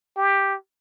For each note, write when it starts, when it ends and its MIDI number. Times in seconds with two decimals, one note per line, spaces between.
0.17 0.55 67